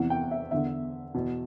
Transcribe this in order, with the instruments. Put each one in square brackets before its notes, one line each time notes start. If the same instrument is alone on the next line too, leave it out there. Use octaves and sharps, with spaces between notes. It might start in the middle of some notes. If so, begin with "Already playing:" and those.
Already playing: [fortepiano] E2 C3 E3 F#5
G5
E5
E2 D3 E5
E2 B2